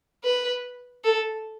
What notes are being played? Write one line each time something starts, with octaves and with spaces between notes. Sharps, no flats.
B4
A4